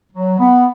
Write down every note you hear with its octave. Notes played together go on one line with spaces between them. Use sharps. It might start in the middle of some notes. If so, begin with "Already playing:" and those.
F#3
B3